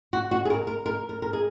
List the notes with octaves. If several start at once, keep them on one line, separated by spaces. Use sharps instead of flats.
F#4
F#4
G#4
A#4
A#4
A#4
A#4
A#4
G#4